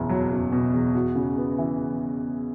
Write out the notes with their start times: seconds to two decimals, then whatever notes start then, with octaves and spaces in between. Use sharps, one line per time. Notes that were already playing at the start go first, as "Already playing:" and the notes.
Already playing: F#1 E2 B2
0.09 F#3
0.30 F#1
0.52 B2
0.73 E2
0.95 F#4
1.15 C#3
1.38 B3
1.58 E3